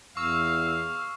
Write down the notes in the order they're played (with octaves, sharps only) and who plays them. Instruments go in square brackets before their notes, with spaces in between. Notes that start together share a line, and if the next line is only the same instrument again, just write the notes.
[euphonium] E2 [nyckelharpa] F5 [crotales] C#6 [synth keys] E6